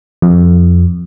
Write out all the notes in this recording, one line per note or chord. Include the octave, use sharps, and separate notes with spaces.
F2